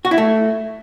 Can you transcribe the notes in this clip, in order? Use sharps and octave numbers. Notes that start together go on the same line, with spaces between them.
F#4
E4
A3